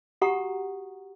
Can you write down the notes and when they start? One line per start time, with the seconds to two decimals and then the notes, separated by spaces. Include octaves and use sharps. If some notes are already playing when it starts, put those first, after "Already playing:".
0.22 F#4 G4 F#5 A#5 C#6 D#6